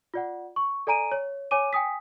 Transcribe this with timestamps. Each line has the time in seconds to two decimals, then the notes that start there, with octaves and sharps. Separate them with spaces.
0.14 F4 D5 F#5
0.56 C#6
0.87 A4 D5 G#5 A#5 D7 D#7
1.12 C#5
1.51 C#5 G#5 D6 D#7
1.73 G5 G#5 D#6 B6